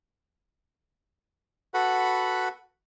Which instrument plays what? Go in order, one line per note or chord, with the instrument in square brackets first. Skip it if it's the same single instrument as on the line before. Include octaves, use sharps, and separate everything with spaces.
[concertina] F#4 A4 B4 F#5 B5